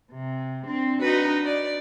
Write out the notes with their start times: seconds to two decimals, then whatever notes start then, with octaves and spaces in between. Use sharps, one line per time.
0.12 C3
0.68 C4 D4
1.01 D#4 F#4 B4
1.46 D5